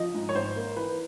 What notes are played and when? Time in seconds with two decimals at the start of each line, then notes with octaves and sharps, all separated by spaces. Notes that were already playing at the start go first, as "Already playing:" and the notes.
Already playing: F3 D#5
0.14 G#2
0.29 C#5
0.35 G#1 C5
0.56 A#3
0.77 E3 B4